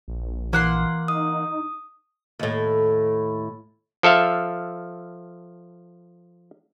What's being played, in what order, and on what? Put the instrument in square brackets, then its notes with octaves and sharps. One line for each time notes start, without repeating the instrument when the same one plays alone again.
[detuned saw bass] A#1
[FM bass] E3 [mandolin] A#3 F#5 C6
[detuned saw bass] D#4 [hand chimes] D#6
[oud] D#2 A2
[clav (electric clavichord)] F3 A4 E5 F5